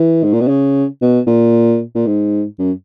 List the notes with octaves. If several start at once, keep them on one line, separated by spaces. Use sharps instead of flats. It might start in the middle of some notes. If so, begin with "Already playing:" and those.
Already playing: E3
G#2
A#2
B2
C#3
B2
A#2
A#2
G#2
F#2